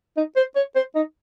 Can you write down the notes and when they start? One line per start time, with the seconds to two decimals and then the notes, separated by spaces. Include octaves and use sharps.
0.17 D#4
0.36 C5
0.56 C#5
0.76 C5
0.95 D#4